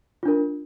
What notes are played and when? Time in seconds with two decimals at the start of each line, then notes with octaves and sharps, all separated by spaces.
0.23 F4
0.25 D4
0.28 A#4